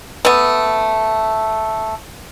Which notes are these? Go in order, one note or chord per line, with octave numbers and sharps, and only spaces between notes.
A3 B3